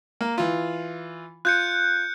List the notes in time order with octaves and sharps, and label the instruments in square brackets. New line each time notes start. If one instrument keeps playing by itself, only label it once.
[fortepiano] A#3
E3 F4
[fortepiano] F4 [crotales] F#6 G6 C#7